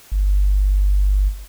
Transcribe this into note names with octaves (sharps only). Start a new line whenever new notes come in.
G1